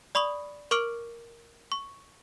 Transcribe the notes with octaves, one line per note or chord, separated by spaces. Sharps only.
D5 B5 C#6 D#6 F#7
A#4 C#6 D6 F6 D7 F#7
C#6